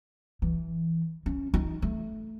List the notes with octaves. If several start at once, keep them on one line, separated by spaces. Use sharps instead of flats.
E3
C#4
D#4
A3